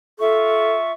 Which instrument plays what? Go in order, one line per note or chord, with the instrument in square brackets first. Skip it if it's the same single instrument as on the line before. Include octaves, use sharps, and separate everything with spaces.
[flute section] F4 E5 C#6 [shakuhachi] A4